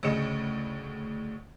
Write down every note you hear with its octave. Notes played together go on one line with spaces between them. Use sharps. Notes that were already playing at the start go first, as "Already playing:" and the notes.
D2 A2 C#3 D#5 C#7 E7